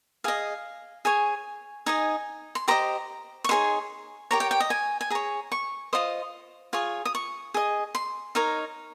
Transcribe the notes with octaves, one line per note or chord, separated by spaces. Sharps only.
G#4 D#5 F5
G#4 C#5 G#5
D#4 G#4 D#5 G#5
C6
G4 C5 D#5 A#5
C#6
D#4 G#4 C#5 C6
G4 A#4 C#5 A#5
G5
G5
D#5
G#5
G#5
G#4 C#5 A#5
C#6
F4 C5 D#5 D#6
F4 G#4 C#5
D#6
C#6
G#4 D#5
C6
D#4 A#4 C#5